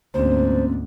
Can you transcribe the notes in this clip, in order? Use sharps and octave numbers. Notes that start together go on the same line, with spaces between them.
D2 G#2 A#3 C4 C#4 C5